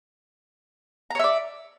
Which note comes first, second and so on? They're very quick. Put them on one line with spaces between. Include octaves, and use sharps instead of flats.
A#5 C#5 E5 D5